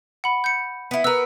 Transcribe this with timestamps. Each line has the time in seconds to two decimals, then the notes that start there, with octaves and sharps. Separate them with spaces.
0.24 F#5 B5
0.44 G6 C#7
0.91 B3 E4
1.04 B3 A#4 B4 E6